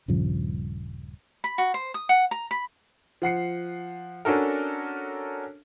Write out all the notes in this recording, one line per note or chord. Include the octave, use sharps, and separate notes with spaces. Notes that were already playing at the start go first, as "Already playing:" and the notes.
D#1 G2 C#3 F3
B5
F#4
C5
D#6
F#5
A#5
B5
F3 F#5 C7 C#7
C#4 D4 F#4 A4 A#4